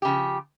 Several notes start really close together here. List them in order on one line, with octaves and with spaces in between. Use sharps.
G4 C#3 F3